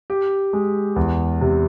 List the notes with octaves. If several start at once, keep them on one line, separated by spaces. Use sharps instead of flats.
G4
G#3
E2
C3